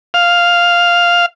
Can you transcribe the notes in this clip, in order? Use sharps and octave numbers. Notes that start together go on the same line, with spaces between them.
F5